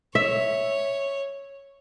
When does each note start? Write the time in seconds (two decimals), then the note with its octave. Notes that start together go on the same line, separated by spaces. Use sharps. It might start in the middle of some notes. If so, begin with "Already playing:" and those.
0.15 C#5 E5